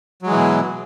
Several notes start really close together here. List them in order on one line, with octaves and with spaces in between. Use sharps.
F#3 G#3 E3 B2